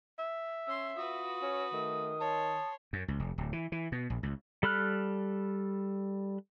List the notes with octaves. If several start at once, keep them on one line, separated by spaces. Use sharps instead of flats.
E5
C#4 C6 E6
F4 F#4 B4 D#6
C#4
D#3 A3
C#5 A5 C6
F#2
C#2
F1
D1
E3
E3
B2
A#1
C#2
G3 A4 B5 F6 F#6